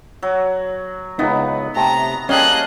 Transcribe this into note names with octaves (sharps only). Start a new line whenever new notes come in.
F#3
C#2 B3 D#4 E4 A#4
C3 A3 A#5
E3 G3 A#3 C#4 G#4 D#5 A5 F#6